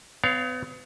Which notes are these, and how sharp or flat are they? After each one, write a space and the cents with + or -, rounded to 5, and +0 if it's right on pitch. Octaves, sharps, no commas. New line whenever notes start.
B3 +40 C#5 +25 F5 -5